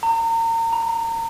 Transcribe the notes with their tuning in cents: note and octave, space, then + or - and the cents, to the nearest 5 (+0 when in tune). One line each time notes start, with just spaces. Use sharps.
A#5 -35
A#5 +30